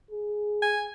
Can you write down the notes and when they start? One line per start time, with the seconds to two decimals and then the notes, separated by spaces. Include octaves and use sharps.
0.11 G#4
0.62 G#5